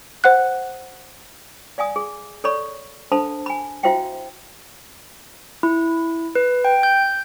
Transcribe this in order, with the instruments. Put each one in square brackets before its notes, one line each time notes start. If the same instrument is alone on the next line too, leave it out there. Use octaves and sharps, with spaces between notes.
[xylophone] C5 F#5 F#6
[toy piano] D5 F5 G#5 D#6
G#4
A4 C#5 D5 B5 C#6
D4 A4 C5 F5 A5 B5
G#5 B5
E4 F#4 C5 E5 F5 G5
[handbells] E4
B4
G5
G6